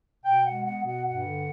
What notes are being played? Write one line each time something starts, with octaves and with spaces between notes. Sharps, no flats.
B2 G5
G#3 F#5
B3 F#5
B2 F#5
G2 F#5
D3